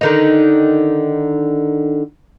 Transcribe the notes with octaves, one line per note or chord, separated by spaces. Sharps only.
D3 D#3 D#4